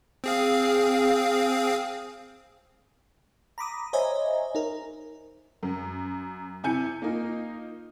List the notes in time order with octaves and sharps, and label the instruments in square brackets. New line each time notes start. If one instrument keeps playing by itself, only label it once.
[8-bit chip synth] C4 G#4 F5
[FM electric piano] A#5 B5 D6 D#6
C5 C#5 D#5 E5 G#5 A#5
D#4 A#4
[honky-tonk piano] F#2
C3 E4 G#5 G6 C#7
A#3 D#4 F4